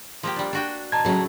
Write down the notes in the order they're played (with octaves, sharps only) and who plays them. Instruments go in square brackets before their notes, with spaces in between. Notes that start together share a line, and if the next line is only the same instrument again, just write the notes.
[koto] F3 A#3 G4
G3 D4
D4 F#4 G5
[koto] B2 [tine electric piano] A5 A#5 G#6
[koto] A2 A3 [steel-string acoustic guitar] C#3 F#3